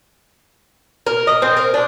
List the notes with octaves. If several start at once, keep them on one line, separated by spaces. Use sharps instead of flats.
A#4
D#5
C4
A#4
D4